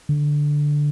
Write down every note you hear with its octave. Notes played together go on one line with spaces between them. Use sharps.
D3